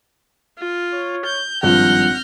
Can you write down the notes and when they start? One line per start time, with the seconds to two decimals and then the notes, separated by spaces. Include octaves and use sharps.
0.59 F4
0.93 C#5
1.25 G6
1.63 G#1 G2 F3 F#5 F6 G6 A#6